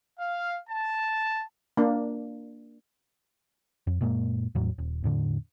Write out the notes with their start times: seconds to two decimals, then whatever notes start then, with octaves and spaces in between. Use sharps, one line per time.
0.18 F5
0.69 A5
1.77 A#3 D4
3.87 F2
4.01 F#2 A#2 G#3 A#3
4.55 E2 A2 F#3
4.78 D#1
5.04 E2 A2 D3